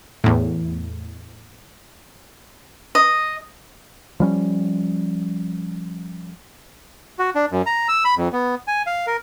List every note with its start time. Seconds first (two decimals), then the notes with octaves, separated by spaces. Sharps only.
0.24 E2 A2
2.95 D#5
4.20 F3 G3 C#4
7.19 F#4
7.35 D4
7.52 F#2
7.66 A#5
7.88 E6
8.05 B5
8.17 F2
8.33 B3
8.67 G#5
8.86 F5
9.07 A#4